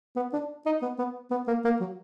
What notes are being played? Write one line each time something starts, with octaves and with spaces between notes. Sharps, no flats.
B3
D4
D#4
B3
B3
B3
A#3
A#3
F#3